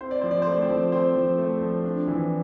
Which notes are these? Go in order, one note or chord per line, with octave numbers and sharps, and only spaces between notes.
C4 C5
D5
F3 C5
D5
C5
A3
D5
C4 C5
F3
C4 C5
F3
A3
F3
D4
E3